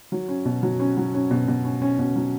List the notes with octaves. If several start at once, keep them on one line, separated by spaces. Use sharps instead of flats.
F#3
C#4
B2
F#3
C#4
F#3
C#4
B2
B2
C#4
C#4
B2
F#3